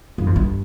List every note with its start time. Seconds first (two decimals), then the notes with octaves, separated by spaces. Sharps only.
0.18 G2
0.26 F2
0.36 G2